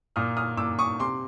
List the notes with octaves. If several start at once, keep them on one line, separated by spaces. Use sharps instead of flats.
A#2 D#6 F6
D#6 F6
A#2 D6 E6
C#6 D#6
C3 C6 D6